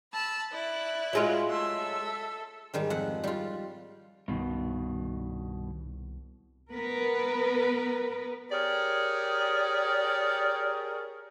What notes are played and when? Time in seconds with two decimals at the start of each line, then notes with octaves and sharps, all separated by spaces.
0.13 A5 B5 E6
0.53 E4 D5 F#6
1.13 F#3 G#3 F4
1.48 A3 E5 C6 E6
1.79 A4
2.74 G#2 D#3 G3
2.90 F2 F#5
3.24 G3 F4
4.28 C2 G2 B2 D#3
6.72 B3 A#4 B4
8.52 G4 G#4 A#4 C#5 D5